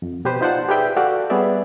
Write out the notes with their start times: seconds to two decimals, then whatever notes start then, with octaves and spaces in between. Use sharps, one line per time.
0.02 F2
0.25 B2 G4 B4 C5
0.41 D#4 F4 C5 D5 F#5 A5
0.69 G4 G#4 B4 D5 E5 G5
0.97 F#4 G4 A4 D5 F5 F#5
1.30 G3 B3 G#4 C#5 D5 E5